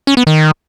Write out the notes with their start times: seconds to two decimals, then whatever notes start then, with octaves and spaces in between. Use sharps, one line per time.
0.07 C#4
0.17 B3
0.27 D#3